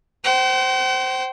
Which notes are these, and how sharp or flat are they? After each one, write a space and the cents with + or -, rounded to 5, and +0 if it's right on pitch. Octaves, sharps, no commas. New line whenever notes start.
C5 +0 G5 -45